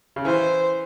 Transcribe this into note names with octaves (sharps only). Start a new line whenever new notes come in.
C#3
E3 C5